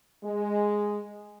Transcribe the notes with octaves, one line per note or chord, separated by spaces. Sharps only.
G#3